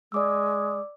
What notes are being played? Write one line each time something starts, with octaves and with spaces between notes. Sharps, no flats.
G#3 D5 D6 E6